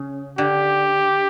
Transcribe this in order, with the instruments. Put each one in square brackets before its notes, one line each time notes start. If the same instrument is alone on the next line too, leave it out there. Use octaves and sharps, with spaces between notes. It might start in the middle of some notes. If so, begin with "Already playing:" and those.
Already playing: [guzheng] C#3
[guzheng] D3 [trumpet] G4